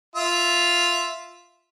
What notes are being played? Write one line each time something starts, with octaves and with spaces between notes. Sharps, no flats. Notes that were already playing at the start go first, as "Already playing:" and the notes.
F4 E5